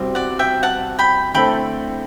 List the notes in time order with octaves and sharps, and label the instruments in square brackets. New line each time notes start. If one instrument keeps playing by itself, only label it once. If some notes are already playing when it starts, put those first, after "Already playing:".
Already playing: [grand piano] C2 B2 G3 C4
[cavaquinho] D5 F#5
E5 G5
F#5 A5
G5 B5
[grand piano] D3 A3 C4 E4 A4 [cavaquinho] G5 B5